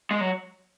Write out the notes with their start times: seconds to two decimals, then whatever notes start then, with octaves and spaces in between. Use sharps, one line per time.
0.11 G#3
0.21 F#3